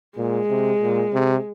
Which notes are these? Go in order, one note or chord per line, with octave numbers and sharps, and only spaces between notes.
A#2 G#3
C3
A#2
C3